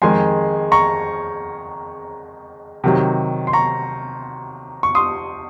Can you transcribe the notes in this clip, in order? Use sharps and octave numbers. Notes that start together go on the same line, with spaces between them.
F2 D#3 G#3 G#5 C6
A#5 C#6
C3 D#3 F#3
C6
A#5 C#6
C#6
C6 D#6